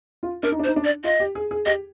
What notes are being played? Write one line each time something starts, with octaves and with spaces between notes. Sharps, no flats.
F4
D4 A#4
D#4
D4
C5
D#4
D4
D5
F4 D#5
G4
G#4
G#4
G4 D#5